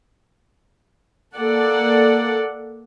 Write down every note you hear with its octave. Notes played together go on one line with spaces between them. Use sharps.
A#3 A4 D5 F#5